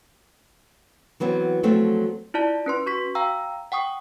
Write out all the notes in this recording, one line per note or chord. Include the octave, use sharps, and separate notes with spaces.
E3 F#3 B3 C4
F3 F#3 A3 C4
E4 F4 D5 A5
C#4 B4 C6
F#4 C#6 B6
F5 G5 A#5 E6
F#5 G5 C#6 D#6